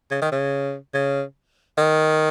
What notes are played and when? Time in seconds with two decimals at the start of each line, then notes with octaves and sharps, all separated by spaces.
0.11 C#3
0.22 D#3
0.32 C#3
0.94 C#3
1.78 D#3